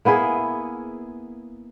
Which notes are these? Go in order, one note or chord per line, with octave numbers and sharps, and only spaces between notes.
A#3 B3 E4 G#4